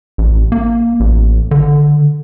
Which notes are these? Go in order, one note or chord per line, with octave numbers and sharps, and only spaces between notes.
A1
A#3
A1
D3